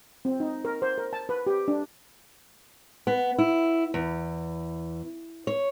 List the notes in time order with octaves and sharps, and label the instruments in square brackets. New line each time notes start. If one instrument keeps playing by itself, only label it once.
[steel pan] C4
D#4
A#4
C5
A#4
A5
B4
G4
D4
[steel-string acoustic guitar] B3
E4
E2
C#5